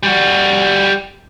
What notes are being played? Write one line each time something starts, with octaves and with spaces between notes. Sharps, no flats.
G3 F#4